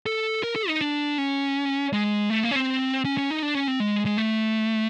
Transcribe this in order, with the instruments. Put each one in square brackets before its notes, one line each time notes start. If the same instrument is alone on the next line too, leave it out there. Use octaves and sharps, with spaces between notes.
[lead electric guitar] A4
A#4
A4
D#4
D4
C#4
G#3
A3
A#3
C#4
C4
C#4
C#4
D#4
D4
C#4
C4
G#3
G#3
A3